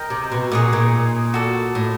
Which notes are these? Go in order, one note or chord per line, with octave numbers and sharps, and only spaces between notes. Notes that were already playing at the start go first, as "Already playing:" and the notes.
Already playing: A#4 D#5 G5
C3
B2
A#2 D#4 G#4 C#5 F#5
A#2
F#4 A4 D5
A2